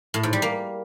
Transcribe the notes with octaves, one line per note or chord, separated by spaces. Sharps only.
A2
G#2
G3
A#3